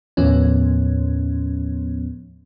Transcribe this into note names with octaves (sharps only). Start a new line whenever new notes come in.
D#2 A2 F3 B3 C#4